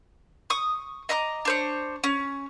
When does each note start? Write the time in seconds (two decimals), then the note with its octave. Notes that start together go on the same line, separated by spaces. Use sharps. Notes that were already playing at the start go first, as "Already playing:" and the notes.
0.50 C#6 D#6
1.09 D#5 E5 A#5 D6
1.45 D4 C5 C#5
2.04 C#4